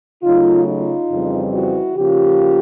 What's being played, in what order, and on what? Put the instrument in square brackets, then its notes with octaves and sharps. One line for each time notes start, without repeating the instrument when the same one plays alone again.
[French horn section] C#3 F#3 A3 D#4 F4
D#4 F4
F2 C#3 E3 G3 C4
E4 F#4
C#3 F3 A#3 C#4 F4 G4